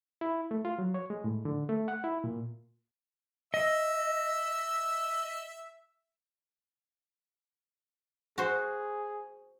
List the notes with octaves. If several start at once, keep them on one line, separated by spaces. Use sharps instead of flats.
E4
A3
F4
F#3
C#5
G#3
A2
D3
A3
F#5
E4
A#2
D#5 E5 E6
F#4 G#4 C5